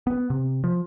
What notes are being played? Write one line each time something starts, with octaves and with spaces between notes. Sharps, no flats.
B3
C3
F3